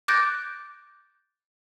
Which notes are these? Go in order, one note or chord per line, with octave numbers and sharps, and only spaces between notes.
D6 F#6 G6 A6 A#6 D7